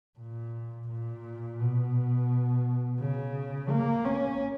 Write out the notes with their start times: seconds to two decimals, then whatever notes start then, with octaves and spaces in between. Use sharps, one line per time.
0.19 A#2
0.89 A#2
1.60 B2
3.00 C#3
3.70 A#3
4.05 C#4